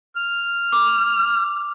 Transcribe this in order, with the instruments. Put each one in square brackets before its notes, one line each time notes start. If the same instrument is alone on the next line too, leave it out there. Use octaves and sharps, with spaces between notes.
[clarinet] F6
[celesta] D6